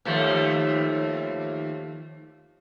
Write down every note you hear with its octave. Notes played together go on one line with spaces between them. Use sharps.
D#2 F3 A3